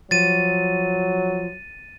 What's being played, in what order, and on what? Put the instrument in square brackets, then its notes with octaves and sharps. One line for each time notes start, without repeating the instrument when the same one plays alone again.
[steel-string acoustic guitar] F3 [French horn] F#3 [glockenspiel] A6 D#7